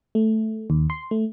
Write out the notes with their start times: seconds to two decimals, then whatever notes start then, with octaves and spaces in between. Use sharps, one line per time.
0.15 A3
0.70 D#2
0.90 C6
1.11 A3